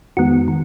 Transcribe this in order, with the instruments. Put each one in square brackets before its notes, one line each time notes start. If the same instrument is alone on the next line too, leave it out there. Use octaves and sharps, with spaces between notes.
[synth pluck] F2 D#3 G#3 B3 F#4
D#3